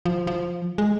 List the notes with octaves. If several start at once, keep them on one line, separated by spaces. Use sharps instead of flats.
F3
F3
G#3